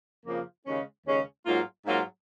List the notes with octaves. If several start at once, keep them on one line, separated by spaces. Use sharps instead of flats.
F2 C#3 F3 A#3
D#2 C#3 G#3 C#4
D#2 C#3 G#3 C#4
G#2 F#3 A#3 F4
G#2 F#3 A#3 F4